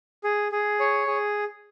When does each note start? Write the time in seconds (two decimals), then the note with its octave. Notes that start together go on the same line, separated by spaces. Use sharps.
0.24 G#4
0.52 G#4
0.80 C#5
1.07 G#4